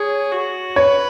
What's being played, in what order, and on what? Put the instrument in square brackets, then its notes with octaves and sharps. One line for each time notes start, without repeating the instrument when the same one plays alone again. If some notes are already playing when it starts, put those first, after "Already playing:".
Already playing: [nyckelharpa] G#4 [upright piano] C#5
[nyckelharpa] F#4
[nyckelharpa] B4 [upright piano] C#5